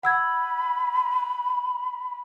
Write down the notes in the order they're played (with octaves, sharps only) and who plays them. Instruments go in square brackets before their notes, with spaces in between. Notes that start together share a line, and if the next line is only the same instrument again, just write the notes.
[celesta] F#5 E6 G#6 [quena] B5